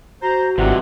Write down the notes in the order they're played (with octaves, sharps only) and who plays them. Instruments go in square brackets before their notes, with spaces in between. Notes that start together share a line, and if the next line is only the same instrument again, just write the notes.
[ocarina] F#4 [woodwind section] C5 A#5
[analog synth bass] G#1 [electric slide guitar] C3 E3 [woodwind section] G3 F4 F#5